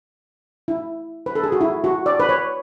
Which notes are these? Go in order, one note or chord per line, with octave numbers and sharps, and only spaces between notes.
E4
B4
A4
G#4
F#4
E4
F#4
D5
B4
C#5